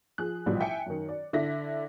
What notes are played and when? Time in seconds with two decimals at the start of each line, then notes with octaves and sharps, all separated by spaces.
0.18 F3 G#4 F#6
0.46 A1 B2 F3 G3
0.60 E5 G5 G#5 C#7
0.86 F#2 D#3
1.09 D5
1.33 D3 E4 A#6 B6